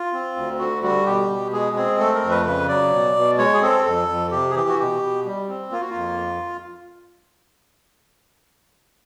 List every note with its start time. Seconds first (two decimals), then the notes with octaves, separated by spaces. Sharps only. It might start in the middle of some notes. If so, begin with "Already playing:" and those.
Already playing: F4
0.13 C4
0.36 D2
0.59 D3 F#4
0.83 G3 F#4
1.06 B2 G4
1.29 B2
1.52 G#3 G#4
1.76 C4 G#4
1.99 A3 A4
2.14 A#4
2.22 F2
2.30 B4
2.45 C#3 B4
2.68 F#3 D5
2.93 B2
3.16 B2
3.38 G#3 C#5
3.54 G#4
3.61 C4 A4
3.85 F2 A4
4.08 F2
4.31 C3 G4
4.50 G#4
4.55 E3 G4
4.69 F#4
4.79 B2 G4
5.02 B2
5.25 G3
5.48 C4
5.71 A#3 F4
5.80 F#4
5.90 F2 F4